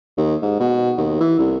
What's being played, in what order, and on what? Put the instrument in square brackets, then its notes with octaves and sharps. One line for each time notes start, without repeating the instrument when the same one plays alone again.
[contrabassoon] D#2
G#2
B2
D#2
E3
C2